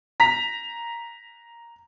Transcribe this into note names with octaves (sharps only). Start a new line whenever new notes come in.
A#5 B6